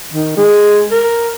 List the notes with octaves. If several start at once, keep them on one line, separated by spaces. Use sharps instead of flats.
D#3
G#3
A#4